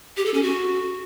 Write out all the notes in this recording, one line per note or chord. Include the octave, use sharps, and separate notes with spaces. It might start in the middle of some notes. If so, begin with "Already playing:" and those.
G4
A4
C#4
F#4